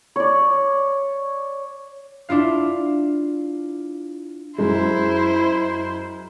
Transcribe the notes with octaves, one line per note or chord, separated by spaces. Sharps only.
C#5 D5
D4 E4 F4 F5
F#2 G#3 E4 C5